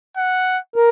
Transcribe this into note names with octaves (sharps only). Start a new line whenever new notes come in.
F#5
A#4